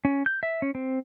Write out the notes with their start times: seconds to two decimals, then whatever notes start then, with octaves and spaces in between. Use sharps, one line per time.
0.05 C#4
0.26 G6
0.43 E5
0.62 C#4
0.75 C4